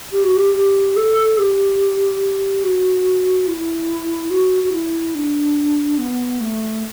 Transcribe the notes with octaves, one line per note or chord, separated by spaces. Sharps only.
G4
F#4
G4
G4
A4
G4
F#4
E4
F#4
F#4
E4
D4
B3
A3